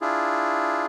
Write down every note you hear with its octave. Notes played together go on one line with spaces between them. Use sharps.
D4 E4 F4 G#4